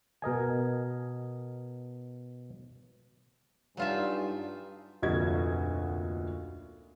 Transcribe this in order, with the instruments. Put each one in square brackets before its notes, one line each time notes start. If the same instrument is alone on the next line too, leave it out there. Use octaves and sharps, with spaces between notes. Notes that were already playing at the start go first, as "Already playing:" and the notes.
[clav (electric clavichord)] B2 A#4 D#5 G#5
[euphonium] G2 [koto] F#3 F4 E5 [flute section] D#4 D5 G#5
[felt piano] F1 D2 A#2 F#4 D#5 G#6